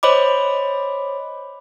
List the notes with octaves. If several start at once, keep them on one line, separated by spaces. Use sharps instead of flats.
C5 C#5 D#5 B5 D6